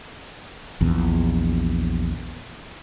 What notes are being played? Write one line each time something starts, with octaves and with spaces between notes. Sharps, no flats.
A#1 E2